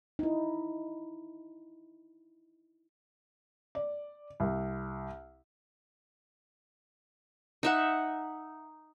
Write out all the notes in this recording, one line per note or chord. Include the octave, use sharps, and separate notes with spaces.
D#4 E4
D5
C2
D#4 E5 F#5